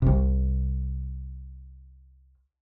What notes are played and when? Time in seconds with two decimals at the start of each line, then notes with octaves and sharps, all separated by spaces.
0.02 C2 C3